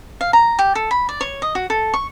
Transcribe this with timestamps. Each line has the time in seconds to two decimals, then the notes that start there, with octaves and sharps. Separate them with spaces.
0.21 F5
0.33 A#5
0.59 G4
0.75 A4
0.91 B5
1.09 D5
1.21 C#5
1.42 D#5
1.55 F#4
1.70 A4
1.94 C#6